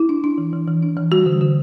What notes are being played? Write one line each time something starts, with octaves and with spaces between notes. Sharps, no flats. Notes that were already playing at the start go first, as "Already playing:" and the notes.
Already playing: E4
D4
D4
E3
E3
E3
D4
E3
G3 F#4
D3
D3